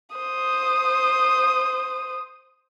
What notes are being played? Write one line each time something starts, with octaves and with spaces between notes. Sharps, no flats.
C5 D#6